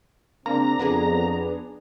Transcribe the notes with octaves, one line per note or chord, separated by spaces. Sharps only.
C#3 A#3 C4 D4 A#5
F2 B3 D4 G#4